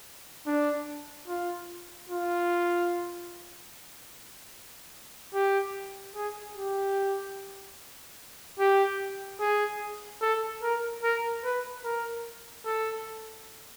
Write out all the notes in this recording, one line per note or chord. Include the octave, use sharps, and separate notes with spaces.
D4
F4
F4
G4
G#4
G4
G4
G#4
A4
A#4
A#4
B4
A#4
A4